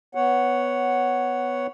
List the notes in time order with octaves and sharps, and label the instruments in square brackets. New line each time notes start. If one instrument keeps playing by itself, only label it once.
[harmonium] B3 C#5 F#5